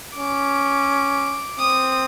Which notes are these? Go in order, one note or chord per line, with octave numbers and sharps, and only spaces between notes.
C#4 D6
C4 D#6